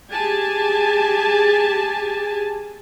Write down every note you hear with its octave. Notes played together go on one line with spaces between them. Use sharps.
G4 G#4 G#5 A5